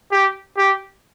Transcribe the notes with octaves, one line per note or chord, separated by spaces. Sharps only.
G4
G4